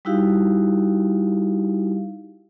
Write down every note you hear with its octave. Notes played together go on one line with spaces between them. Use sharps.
G3 D#4 E4 F#4 G4 F5